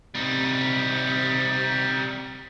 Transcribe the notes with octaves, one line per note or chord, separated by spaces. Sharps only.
C3 G3 D#4